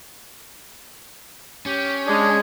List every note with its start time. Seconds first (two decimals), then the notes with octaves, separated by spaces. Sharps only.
1.66 C#4 G4
2.07 G#3 D4 G#4